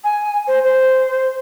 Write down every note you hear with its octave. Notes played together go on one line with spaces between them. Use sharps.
G#5
C5
C5